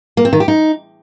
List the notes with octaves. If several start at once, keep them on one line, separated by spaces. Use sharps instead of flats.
A#3
C4
D#3
G4
D#4